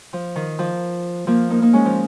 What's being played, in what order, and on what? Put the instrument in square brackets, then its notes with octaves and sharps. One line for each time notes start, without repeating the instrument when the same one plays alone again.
[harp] F3
D#3
F3
F3 A#3
A#3 D#4
A#3 D#4
G#3 C#4
F3